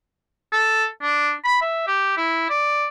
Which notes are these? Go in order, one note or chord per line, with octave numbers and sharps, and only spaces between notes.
A4
D4
B5
E5
G4
E4
D5